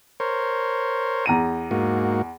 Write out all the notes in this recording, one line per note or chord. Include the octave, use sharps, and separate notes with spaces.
A#4 C5 C#5
E2 A#5 D#7
G#2 A#3 F#4